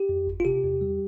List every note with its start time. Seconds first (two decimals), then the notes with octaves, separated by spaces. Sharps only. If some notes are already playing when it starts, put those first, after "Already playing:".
Already playing: G4
0.09 F2
0.27 G1
0.40 F4
0.45 C3 G4
0.64 E2
0.81 G3